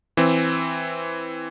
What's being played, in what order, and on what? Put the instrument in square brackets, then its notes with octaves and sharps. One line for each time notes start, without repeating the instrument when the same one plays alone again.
[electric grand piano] E3 C4